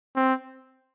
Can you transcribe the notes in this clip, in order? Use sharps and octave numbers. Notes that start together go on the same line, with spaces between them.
C4